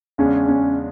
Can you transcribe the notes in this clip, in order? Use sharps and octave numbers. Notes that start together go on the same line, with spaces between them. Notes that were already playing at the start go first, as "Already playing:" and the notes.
E2 C#3 G#3 C#4 D4
C#4